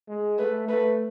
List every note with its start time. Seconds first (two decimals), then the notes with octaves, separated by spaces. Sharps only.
0.08 G#3
0.38 A3 B4
0.68 A3 B4